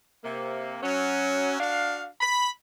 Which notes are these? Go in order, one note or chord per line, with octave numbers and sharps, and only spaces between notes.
C3 A#3
F#3 C#4
D4 F#4 F5
B5